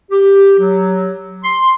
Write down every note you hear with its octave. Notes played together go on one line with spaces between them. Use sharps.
G4
F#3
C6